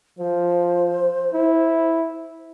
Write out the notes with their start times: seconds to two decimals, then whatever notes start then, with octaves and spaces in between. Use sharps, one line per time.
0.19 F3 C5
1.34 E4